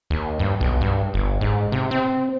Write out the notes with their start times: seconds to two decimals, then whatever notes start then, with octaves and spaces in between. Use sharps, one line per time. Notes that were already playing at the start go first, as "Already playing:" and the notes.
0.10 D#2
0.39 G2
0.61 B1
0.81 G2
1.14 G1
1.41 G#2
1.72 C3
1.91 C4